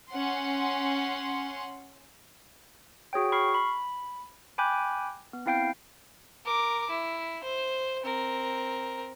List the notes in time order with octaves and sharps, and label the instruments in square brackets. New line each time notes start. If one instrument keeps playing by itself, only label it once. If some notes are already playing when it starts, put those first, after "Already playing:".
[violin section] C#4 F#5 C6
[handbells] F#4 G#4 C#5 G5
B5 C#6 F6 C7
B5
G5 G#5 B5 D6 F#6 G6
B3
C4 E4 F5 G5 G6 C7
[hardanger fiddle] A#4 D6
E4
C5
C4 A#4